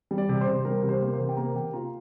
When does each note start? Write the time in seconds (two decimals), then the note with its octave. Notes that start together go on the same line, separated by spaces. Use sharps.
0.11 G3
0.18 D5
0.29 C3
0.41 C5
0.47 C3
0.65 G3 A#4
0.83 C3
0.89 C5
1.02 A#3
1.13 C5
1.20 C3
1.29 G5
1.37 A#3 A#5
1.55 C3 G5
1.73 F4 A#5